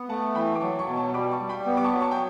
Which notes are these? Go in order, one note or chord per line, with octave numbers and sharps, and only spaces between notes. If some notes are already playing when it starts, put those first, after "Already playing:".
Already playing: B3
A3 F#5 A5
E3 G5 B5
D6
F#3 A5 C#6
A5 C#6
B2
A5 C#6
G3 B5 D6
A5 C#6
G3
G5 B5
B3
D6
A5 C#6
F#3
A5 C#6
G5